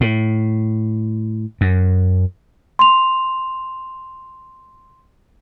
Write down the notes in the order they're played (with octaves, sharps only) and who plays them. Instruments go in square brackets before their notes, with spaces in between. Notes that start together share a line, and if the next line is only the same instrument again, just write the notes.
[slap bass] A2
F#2
[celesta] C6 F7